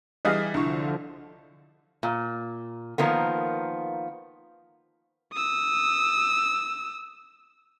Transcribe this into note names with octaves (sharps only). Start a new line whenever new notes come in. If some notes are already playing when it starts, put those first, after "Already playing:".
E3 G3 G#4 D#5 F5
C2 D3 F3 D4 E4 C#6
A#2
D#3 F3 A#3 B3
D#6 E6